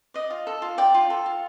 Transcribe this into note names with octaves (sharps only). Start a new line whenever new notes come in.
D5 D#5
F4
A4
F4
D5 G5
F4
A4
F4